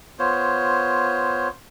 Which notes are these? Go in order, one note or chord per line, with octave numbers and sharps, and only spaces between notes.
B3 F4 C5 C#5